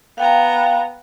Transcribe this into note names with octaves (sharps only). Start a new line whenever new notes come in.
B3 F5 G5 A#5